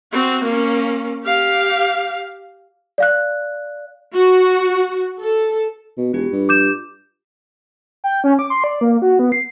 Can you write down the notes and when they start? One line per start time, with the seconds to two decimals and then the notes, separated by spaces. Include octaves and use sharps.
0.12 C4 F#4
0.44 A#3 C#4
1.24 G4 F5
2.98 D5 F5 F#6
4.13 F#4
5.21 A4
5.97 B2
6.13 E1 F4 G4
6.32 G2
6.49 D6 G6 E7
8.04 G5
8.24 C#4
8.39 D6
8.50 C6
8.64 D5
8.81 A#3
9.02 F#4
9.19 B3
9.32 C7